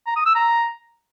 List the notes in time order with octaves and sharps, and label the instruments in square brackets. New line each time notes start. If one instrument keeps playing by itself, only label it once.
[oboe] A#5
D#6
E6
A#5